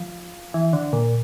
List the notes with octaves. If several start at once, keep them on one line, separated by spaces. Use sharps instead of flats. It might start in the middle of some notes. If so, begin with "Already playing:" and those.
Already playing: F3
E3
D3
A#2